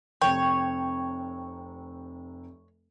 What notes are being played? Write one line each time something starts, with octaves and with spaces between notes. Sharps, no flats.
F1 C3 C#5 G5